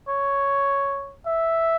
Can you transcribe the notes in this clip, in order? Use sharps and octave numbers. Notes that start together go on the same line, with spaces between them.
C#5
E5